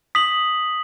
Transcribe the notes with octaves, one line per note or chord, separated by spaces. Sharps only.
D#6 B6 F#7